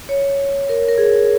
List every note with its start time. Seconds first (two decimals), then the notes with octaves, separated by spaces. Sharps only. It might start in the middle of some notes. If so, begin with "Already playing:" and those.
0.09 C#5
0.69 A#4
0.88 A#4
0.98 G#4